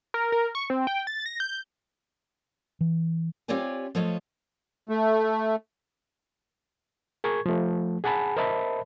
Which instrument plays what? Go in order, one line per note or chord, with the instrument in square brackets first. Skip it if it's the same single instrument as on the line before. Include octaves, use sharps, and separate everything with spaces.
[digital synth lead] A#4
A#4
C#6
C4
G5
A6
A#6
G6
[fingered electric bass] E3
[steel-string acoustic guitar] C4 F4 G4 C#5 D5 G#5
F3 A3 F4 A4 C#5 D#5
[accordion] A3
[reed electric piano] G#4 A#4 C#6 G#6
F3 A3
G#4 F#5 G#5 A5 B5
A#4 C5 D#5 E5 A5 B5